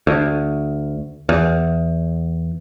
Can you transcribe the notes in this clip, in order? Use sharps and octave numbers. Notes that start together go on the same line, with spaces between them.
D2
E2